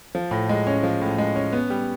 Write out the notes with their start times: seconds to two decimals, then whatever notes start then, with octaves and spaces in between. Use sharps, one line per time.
0.15 F3
0.31 A2
0.49 G#3
0.67 C#4
0.83 F3
1.01 A2
1.18 G#3
1.36 C#4
1.52 B3
1.70 G3